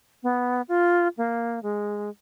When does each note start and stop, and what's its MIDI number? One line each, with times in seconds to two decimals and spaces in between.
0.23 0.62 59
0.68 1.08 65
1.17 1.62 58
1.63 2.10 56